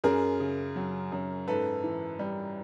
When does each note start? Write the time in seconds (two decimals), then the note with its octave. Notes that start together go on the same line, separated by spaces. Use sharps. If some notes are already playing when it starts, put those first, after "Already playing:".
0.04 F#2 G#4 A#4
0.40 C#3
0.76 F#3
1.12 F#2
1.47 G#2 A4 B4
1.84 E3
2.19 G3